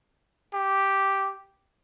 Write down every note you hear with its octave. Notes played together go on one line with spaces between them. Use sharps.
G4